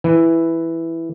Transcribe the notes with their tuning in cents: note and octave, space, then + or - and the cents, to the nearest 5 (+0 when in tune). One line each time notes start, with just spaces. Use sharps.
E3 +0